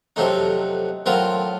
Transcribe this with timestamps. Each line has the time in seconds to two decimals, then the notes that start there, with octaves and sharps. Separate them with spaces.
0.16 F2 C3 F#3 A3 D#4
1.06 A2 F#3 C4 F4 A#4